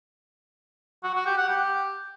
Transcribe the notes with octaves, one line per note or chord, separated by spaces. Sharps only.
F#4
F#4
G4
F#5
G4